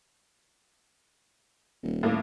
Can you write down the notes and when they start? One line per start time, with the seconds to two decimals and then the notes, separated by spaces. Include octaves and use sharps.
1.83 D#1
2.03 A2 A#3